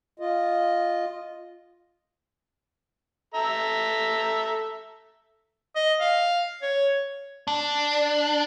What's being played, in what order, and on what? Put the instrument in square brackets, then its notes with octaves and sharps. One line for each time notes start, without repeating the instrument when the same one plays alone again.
[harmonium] F4 D#5
[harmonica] A4 E5 A#5
[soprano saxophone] D#5
F5
C#5
[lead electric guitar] D4